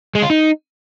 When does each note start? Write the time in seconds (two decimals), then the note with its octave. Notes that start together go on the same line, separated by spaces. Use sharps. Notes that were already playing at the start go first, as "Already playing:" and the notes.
0.15 G#3
0.22 F4
0.30 D#4